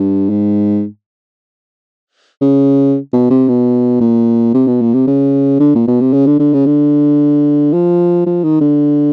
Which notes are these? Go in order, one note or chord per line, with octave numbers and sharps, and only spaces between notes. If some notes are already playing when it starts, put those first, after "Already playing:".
Already playing: G2
G#2
C#3
B2
C3
B2
A#2
C3
B2
A#2
C3
C#3
D3
A#2
B2
C3
C#3
D3
D3
C#3
D3
F3
F3
D#3
D3